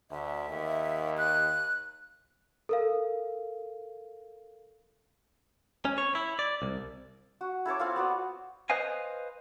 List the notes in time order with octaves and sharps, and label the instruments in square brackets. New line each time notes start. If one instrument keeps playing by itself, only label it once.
[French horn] D2 [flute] E5
[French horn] D#2
[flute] F#6
[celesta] A4 A#4 F5
[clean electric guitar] C#4
C#5
E4
D5
C2
[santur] F#4
E4 A4 C#5 D6
C4 F4 F5
B3 F#4 D5
[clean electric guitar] B4 C5 D#5 F5 G#5